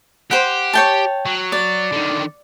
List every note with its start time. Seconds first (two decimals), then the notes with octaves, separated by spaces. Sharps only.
0.31 G4 C5 F#5
0.73 C#5 G5 A5
1.26 F#3
1.52 D5
1.92 D3 D#3